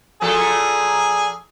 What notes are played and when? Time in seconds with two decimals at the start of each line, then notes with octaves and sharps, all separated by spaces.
0.22 A#2 F3 G#4 A4